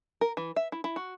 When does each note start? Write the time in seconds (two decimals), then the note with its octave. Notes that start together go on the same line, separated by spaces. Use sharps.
0.21 A#4
0.37 E3
0.56 E5
0.72 E4
0.84 E4
0.96 F#4